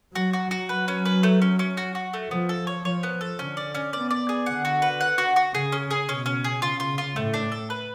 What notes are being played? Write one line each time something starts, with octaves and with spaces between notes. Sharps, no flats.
F#3 F#4
F#4
F#4
F#3 B4
C#4
B4
A3
C#4
C#4
F#4
F#4
A3
F3 B3
A4
C#5
F3 C#5
B3
A4
D3 C#4
D5
C#4
B3 D5
D5
G#4
D3 F#5
F#4
B4
F#5
F#4
F#4
C#3 G#4
C#4
G#4
B2 C#4
C#4
G#4
C#3 F4
F4
F4
A2 A3
D4
A4
B4